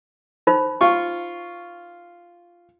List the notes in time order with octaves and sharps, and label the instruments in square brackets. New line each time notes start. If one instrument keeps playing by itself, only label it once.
[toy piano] D#4 C5 B5
[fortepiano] F4 C#6